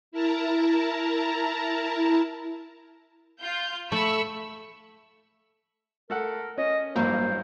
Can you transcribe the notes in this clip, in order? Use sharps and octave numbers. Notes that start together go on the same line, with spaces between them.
E4 A#4 A5 A#5
F4 G6
A3 B5 C#6 E6
A3 A4 A#4 F#5
C#4 D#5
A1 G2 F#3 A#3 C5